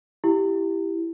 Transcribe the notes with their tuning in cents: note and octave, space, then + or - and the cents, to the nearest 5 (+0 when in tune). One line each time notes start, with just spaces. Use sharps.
E4 +10 G4 +0